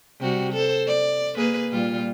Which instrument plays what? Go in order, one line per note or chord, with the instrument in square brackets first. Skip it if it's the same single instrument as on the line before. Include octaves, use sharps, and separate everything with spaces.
[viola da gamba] C3 G3 F#4
A4 C5
D5
A#3 G#4 B4
A#2 G3 F4